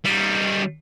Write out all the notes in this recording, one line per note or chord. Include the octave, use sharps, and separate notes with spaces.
G3 D#4